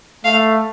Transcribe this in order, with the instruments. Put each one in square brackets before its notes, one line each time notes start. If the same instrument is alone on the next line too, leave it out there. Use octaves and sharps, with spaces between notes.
[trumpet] A3 [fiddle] F5